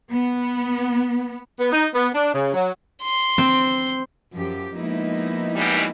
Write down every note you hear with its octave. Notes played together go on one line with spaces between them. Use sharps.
B3
B3
D#4
B3
D4
C#3
F#3
C6
C4
F#2 F3 G4
F3 G#3 A#3 B3 D#4 E4
F#2 B2 G3